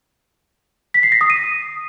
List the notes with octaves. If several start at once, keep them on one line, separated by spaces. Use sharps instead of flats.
B6
C7
A#6
D#6
D#7